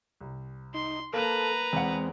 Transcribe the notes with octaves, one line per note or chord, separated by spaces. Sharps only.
C2
D#4 C6
A#3 A4 B4 A#5
E2 G#3 C4 F#5